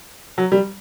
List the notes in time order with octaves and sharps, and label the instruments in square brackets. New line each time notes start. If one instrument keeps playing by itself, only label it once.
[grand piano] F#3
G3